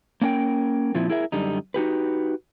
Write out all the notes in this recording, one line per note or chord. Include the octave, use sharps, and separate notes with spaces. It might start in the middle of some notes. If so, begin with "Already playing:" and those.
A#3 C#4 D4 A#4 G5
A#2 F3 C4 E4
E4 G#4 A#4 E5
F#2 D3 G3 D#4
D#4 F#4 G4 B4